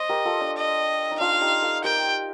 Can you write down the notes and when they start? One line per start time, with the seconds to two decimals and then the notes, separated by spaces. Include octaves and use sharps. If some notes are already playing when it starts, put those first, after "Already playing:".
Already playing: C5 D#5
0.09 G4 A#4
0.25 F4 A4
0.41 D4
0.57 D#5
1.11 D#4
1.20 D4 F4 F5
1.41 D#4 G4
1.62 F4 A4
1.84 G4 A#4 G5